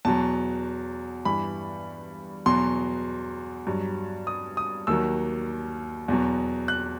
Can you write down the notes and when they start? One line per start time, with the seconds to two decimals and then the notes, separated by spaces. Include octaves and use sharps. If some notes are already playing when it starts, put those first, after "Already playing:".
0.05 E2 B2 F#3 A5
1.25 G2 E3 B5
2.46 E2 B2 F#3 C6
3.67 G2 F#3
4.27 D#6
4.57 D#6
4.87 D#2 D#3 F#3 E6
6.08 E2 B2 F#3
6.68 F#6